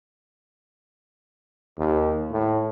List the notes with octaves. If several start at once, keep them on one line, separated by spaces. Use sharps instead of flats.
D#2
A2